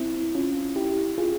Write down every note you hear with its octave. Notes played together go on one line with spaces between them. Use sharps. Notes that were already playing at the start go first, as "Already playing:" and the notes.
Already playing: C4 E4
C#4 F4
E4 G4
F4 G#4